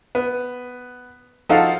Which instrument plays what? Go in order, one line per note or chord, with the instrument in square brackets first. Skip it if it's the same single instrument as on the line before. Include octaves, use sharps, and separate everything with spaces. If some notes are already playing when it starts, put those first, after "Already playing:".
[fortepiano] B3
F3 D#4 F#4 A4 F5